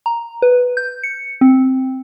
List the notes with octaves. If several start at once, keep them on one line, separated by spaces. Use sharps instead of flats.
A#5
B4
G6
C#7
C4